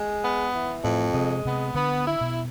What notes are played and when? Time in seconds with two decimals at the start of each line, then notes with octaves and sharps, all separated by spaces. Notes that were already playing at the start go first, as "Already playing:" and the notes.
Already playing: G#3
0.23 B3
0.53 E3
0.83 F2 A2
1.14 C3 G#3
1.44 C3 B3
1.75 D3 B3
2.06 E4
2.21 B2